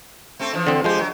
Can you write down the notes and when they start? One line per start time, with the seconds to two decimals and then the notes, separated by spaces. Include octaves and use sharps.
0.39 A3 C4 A4
0.53 E3 F3 D4
0.67 D3 C4
0.84 D3 F3 G#3 G4 C5
0.98 F#3